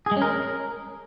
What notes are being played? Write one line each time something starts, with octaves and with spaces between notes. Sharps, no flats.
G#4
G#3
C#4
A#4